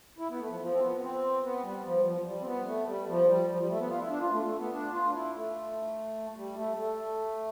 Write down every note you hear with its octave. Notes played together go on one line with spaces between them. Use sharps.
E4
B3
A3
F3
F3
C4
B3
B3
C4
B3
G3
F3
F3
F3
G3
C4
B3
A3
G3
F3
G3
F3
G3
A3
B3
F4
E4
D4
F4
A3
A3
B3
D4
F4
D4
E4
A3
G3
A3
A3